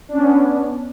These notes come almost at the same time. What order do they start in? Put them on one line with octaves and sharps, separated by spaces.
D4 C#4 B3